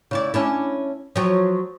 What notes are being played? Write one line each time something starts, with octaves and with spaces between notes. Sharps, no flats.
C#3 E4 D5
C#4 D4 E4
F3 F#3